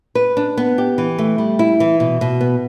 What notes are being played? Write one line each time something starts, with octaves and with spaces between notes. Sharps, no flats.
B4
D4
B3
G4
E3
A3
G3
E4
E3
B2
B2
B3